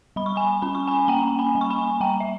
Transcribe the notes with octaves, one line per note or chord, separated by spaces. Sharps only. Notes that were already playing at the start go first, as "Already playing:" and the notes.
G3 B5
C#6
G#5 B5
C#4 B5
C#6
G#5 B5
A#3 G5 A#5
G#5 B5
G3
C#6
G#5 B5
G3 G5 A#5
E5